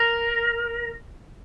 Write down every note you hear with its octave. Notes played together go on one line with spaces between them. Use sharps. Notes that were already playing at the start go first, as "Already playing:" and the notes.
Already playing: A#4